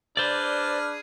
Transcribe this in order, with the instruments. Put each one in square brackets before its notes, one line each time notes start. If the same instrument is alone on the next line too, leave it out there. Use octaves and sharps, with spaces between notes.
[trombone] D4 [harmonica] G#4 B4 F6 [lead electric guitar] C5 D5